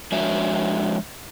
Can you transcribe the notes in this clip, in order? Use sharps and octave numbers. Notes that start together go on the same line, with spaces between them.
F3 G#3 D4 F#4 C#5 E5